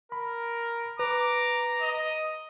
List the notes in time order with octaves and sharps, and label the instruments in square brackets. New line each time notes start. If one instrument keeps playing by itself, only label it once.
[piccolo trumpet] A#4 [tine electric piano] B5
[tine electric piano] B4 [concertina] A#5 [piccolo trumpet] D6
[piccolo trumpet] D#5